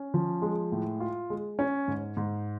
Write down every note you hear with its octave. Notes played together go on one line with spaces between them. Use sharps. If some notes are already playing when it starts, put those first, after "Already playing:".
Already playing: C#4
F3
G#3
A2
F4
G#3
C#4
G#2
G#2